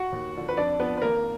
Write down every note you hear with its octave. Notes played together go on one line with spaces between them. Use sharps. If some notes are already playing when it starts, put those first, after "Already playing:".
Already playing: F#4 F#5
D#2
D3 F3
B4
F2 D4 D5
F3 B3 B4
B4
G#1 A#3 A#4